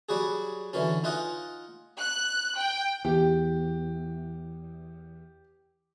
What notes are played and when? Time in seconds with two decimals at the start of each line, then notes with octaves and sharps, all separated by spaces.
0.09 F#3 G3 F#4 G#4
0.73 D3 E3 F#3 C#4
1.04 D#4 F4 D#5 F#5 G#5
1.98 F#6
2.57 G5
3.05 E2 G4